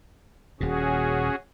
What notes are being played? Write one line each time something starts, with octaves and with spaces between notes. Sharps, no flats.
D#1 A#2 C#4 F#4 G#4